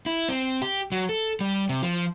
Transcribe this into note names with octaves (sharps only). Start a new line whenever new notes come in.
E4
C4
G4
F#3
A4
G3
C3
F3